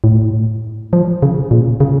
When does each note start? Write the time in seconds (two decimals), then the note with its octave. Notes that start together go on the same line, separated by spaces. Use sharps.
0.04 A2
0.93 F3
1.22 C#3
1.51 A#2
1.80 C#3